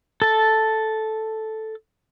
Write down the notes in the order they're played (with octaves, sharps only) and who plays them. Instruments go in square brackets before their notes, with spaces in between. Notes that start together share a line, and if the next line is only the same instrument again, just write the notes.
[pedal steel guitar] A4 A5